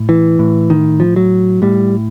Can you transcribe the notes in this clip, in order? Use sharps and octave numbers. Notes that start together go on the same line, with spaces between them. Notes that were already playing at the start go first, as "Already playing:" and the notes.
Already playing: A2
E3
A2
D#3
F3
F#3
A2 G3